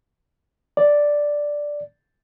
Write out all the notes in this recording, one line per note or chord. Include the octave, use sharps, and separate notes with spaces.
D5